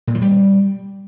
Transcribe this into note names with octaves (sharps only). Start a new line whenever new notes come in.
A#2
F3
G3